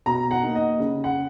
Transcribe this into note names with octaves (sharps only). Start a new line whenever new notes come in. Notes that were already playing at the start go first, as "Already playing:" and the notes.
B2 A#5
F#5
A#3 D#4
D#5
C#3
F#5